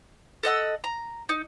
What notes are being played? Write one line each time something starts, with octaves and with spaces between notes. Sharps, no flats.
A4 D#5 F#5 E6
A#5
D#4